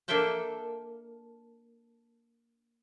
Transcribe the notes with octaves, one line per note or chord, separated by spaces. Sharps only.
A#3 D4 A4 E5 G5 A5